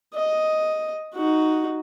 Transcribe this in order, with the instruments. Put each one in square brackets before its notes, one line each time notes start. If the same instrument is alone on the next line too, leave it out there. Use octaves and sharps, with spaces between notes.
[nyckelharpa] D#5
D#4 F#4